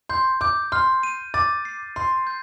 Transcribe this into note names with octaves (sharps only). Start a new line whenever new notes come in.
C6 G6
D6 G6
C6 F6
D#7
D6 A6
C7
C6 C7
G6